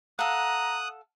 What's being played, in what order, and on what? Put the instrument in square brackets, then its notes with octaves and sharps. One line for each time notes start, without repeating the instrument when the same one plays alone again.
[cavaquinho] A4 F5 F#5 [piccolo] A#5 [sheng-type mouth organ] D#6 F#6